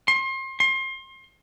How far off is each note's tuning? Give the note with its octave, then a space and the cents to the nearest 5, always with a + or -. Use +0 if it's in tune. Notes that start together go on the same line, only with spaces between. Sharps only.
C6 +35
C6 +30